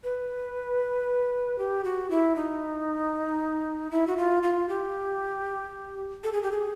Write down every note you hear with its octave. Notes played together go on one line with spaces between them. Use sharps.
B4
G4
F#4
E4
D#4
E4
F#4
F4
F4
G4
A4
G#4
G4
G#4